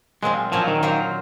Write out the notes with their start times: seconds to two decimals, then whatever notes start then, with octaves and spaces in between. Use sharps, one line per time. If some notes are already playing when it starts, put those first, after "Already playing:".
0.22 A#2 F#3 G#3 C4 F4
0.52 A#2 F3 F#3 C#4 F#4
0.68 D#3
0.83 F#3 A#3 F4 C5